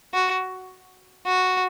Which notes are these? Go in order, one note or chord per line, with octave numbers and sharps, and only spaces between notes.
F#4
F#4